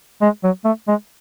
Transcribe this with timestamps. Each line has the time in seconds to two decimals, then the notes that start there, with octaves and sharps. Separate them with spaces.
0.22 G#3
0.44 F#3
0.65 A3
0.88 G#3